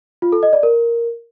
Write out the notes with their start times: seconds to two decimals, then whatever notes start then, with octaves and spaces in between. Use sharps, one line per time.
0.22 F4
0.32 A4
0.43 D#5
0.53 D5
0.63 A#4